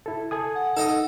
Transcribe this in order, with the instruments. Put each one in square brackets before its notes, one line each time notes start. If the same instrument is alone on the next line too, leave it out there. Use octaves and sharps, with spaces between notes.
[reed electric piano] E4 A4
A4 G#5 D#6
[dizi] F#5
[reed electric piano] D#4 [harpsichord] A4 D#5